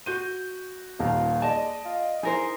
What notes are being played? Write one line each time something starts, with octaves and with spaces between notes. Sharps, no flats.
F#4 G6 D#7
D#1 D#2 F4 A#5
G#3 D5 D#5 A5
F4
D#4 E4 G#4 A#4 C5